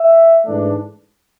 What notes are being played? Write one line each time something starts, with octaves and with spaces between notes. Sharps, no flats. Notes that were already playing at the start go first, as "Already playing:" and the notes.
Already playing: E5
G#2 E3 A3 D4